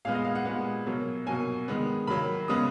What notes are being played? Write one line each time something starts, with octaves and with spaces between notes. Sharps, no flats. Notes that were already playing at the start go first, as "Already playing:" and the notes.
A#2 G#3 B3 F5
D#5
F5
F#5
A#2 G#3 B3
B2 F#3 A#3
B2 F#3 A#3 G#5
D#3 G#3 B3
D#3 F#3 A#3 B5
C#3 G#3 B3 D#6